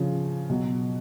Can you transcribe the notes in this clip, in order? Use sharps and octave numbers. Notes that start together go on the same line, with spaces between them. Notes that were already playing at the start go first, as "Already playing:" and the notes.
Already playing: C#3 F3
B2 F#3